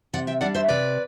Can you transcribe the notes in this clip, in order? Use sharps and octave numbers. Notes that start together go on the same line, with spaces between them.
C3 D5 F#5
E5 G5
G3 D4 D5 F#5
C5 E5
C3 B4 D5